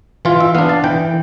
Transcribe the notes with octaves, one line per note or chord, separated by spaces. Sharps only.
E3 F4
E5
B3 D4 F5
A5
E3 G5